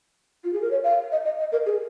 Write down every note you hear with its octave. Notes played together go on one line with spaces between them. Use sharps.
F4
G#4
A#4
C#5
F5
D#5
D#5
D#5
A#4
G#4